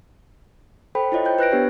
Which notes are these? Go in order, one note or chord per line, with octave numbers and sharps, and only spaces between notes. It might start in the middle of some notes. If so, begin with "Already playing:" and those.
A4 C5 G5 B5
E4 F4 C#5 D#5
C5 G5 G6
B4 F#6 A#6 D7
B3 D4 G4 C#5